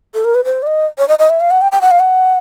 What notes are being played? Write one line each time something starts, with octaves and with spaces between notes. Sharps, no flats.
A4
A#4
B4
C5
D5
D#5
C#5
D#5
D#5
E5
F5
F#5
G5
G5
F#5
F5
F#5